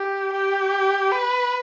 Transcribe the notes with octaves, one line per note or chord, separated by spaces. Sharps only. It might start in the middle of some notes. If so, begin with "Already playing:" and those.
Already playing: G4
G4
B4